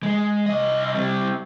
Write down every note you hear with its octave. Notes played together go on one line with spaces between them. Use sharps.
G#3
C2 D#5
G3 C4